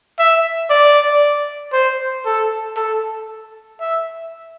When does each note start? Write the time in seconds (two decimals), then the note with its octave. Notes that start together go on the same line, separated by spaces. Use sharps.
0.19 E5
0.70 D5
1.73 C5
2.25 A4
2.76 A4
3.80 E5